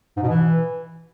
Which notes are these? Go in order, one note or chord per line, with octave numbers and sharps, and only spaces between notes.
G#2
B2
E3